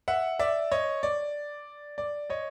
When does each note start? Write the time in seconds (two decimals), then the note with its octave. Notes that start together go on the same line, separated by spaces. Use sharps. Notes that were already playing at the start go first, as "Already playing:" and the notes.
0.08 E5 F#5
0.39 D5 E5
0.72 C#5 D#5
1.03 D5
1.98 D5
2.30 C#5 D#5